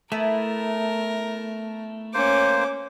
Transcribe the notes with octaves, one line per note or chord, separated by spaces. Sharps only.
A3 B3 E4 A#4
A#3 C#4 C5 D6